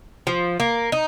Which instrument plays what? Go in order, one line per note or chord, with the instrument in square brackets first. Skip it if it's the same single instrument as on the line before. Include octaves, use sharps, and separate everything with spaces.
[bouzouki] F3
A#3
D#4